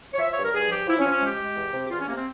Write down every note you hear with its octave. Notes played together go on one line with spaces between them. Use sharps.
C#5
F3 E5
C#5
G2
A#4
G2 G#4
F3 G4
F3 E4
C#4
F3
C#4
G#3 G4
G#3
E2
C3
G4
E2 F4
C#4
C3 A#3
C4